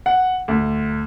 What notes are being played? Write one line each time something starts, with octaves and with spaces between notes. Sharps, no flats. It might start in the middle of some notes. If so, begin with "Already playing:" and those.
F#5
D2